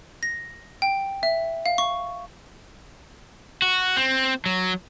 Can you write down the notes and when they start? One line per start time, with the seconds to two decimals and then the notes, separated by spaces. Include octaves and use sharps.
0.23 A#6
0.82 G5
1.23 E5
1.66 F5
1.78 C#6
3.62 F#4
3.97 C4
4.46 F#3